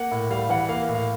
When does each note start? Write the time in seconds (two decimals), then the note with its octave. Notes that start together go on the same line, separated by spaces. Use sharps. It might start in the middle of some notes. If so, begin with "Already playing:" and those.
Already playing: A#3 F#5
0.11 A2
0.30 G3 F5
0.49 E3 F#5
0.69 A#3 F5
0.89 A2
0.95 F5